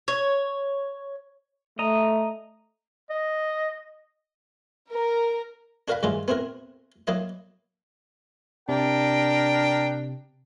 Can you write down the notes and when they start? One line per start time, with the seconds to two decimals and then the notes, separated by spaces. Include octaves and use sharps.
0.08 C#5
1.79 A3 D#5 A#5
3.10 D#5
4.92 A#4
5.88 D4 F#4 A#4 F5 F#5 B5
6.03 G2 D#3 G#3 C#4 E4 F4
6.28 B3 C4 E4 F#4 A#4
7.07 F#3 A#3 E4 D#5
8.69 C3 D4 A#4 G5